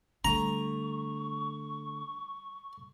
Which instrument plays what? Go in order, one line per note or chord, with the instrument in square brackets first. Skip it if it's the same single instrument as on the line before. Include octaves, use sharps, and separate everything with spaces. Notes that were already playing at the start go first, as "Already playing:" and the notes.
[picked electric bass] D3 A3 [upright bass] G3 [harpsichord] A#5 [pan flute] C#6